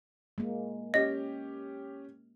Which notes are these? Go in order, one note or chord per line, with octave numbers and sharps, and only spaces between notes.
G#3 A#3
C#4 G4 D#5